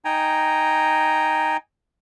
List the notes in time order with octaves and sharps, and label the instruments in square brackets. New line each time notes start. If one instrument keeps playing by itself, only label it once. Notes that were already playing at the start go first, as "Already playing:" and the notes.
[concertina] D#4 G5 G#5 A#5